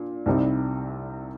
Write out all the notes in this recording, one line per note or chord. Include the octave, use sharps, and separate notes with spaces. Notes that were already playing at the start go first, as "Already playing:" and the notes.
Already playing: A#2 D4
C2 C3 G3 C4 D#4